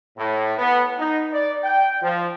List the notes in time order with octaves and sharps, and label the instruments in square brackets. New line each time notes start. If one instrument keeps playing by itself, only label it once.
[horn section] A2
B3
D#4
D5
G5
F3